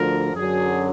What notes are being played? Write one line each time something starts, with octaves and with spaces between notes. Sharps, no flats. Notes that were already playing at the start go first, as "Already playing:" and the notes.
Already playing: D2 D3 F3 A#4
F#2 D3 F#3 G#4